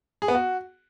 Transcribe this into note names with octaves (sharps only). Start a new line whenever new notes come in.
G#4
B3
F#4